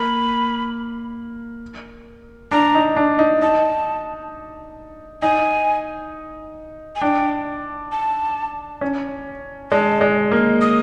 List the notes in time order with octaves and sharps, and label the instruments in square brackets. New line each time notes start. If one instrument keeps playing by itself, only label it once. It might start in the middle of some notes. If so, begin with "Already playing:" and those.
Already playing: [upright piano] A#3 [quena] B5
[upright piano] D4 [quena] A#5
[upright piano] D#4
D4
D#4
[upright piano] D#4 [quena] A5
[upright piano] D#4 [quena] G#5
[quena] G#5
[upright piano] D4 [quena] G5
[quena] A5
[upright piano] C#4
[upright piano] G#3 [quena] A5
[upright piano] G#3
A#3
[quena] D#6